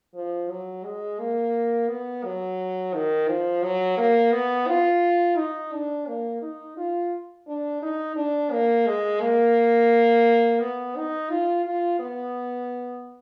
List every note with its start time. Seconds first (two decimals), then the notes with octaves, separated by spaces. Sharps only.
0.15 F3
0.50 F#3
0.84 G#3
1.19 A#3
1.88 B3
2.24 F#3
2.94 D#3
3.28 F3
3.63 F#3
3.97 A#3
4.32 B3
4.68 F4
5.37 D#4
5.72 D4
6.07 A#3
6.42 D#4
6.77 F4
7.47 D4
7.82 D#4
8.16 D4
8.51 A#3
8.87 G#3
9.21 A#3
10.60 B3
10.96 D#4
11.30 F4
11.65 F4
11.99 B3